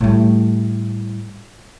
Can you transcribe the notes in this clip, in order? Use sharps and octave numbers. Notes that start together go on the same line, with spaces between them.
A2 G3